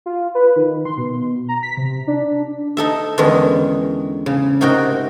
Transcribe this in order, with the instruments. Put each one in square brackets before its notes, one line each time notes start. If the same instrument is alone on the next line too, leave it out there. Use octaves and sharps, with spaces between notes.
[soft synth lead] F4
B4
D#3
C6
B2
A#5
B6
C3
D4
[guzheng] D#4 A4 E5
E2 D3 D#3 G#3 C#4
C#3
G#2 C3 D#4 F#4 A#4 G5